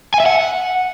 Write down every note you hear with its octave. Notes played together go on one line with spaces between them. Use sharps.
G#5
E5
F#5